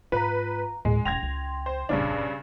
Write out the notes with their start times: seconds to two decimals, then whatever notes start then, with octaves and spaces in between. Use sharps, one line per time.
0.12 G#2 F4 B4 A#5
0.85 D2 A2 G#3
1.05 E1 C#4 G5 C6 G#6 A#6 F7
1.23 C#2
1.66 C5
1.89 F1 A#1 G2 C#3 D4